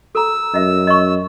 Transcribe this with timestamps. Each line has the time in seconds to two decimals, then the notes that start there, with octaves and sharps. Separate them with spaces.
0.15 A4 A#5 E6
0.54 F#2 D#5 E5
0.87 D#5 C#6